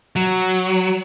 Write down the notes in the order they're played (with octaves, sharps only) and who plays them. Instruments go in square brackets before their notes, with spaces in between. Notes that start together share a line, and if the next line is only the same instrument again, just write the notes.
[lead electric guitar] F#3